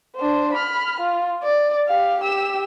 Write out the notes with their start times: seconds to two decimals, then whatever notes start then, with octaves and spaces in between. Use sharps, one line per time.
0.16 D4 C5
0.53 B5 F6
1.01 F4
1.43 D5
1.87 G4 F5
2.21 G4 E6